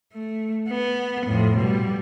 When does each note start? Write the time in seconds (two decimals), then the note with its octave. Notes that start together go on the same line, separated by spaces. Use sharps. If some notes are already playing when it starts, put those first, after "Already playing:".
0.14 A3
0.69 B3
1.26 F2 A2
1.58 B2 G3